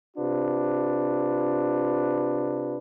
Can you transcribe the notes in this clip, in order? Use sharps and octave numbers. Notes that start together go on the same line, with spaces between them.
C3 D4 F4 B4